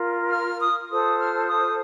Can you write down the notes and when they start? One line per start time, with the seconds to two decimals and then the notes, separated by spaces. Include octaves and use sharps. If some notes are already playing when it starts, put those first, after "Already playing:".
Already playing: F4 A#4
0.31 F6
0.60 D#6
0.89 F4 A4 C5 D#6
1.19 F6
1.48 D#6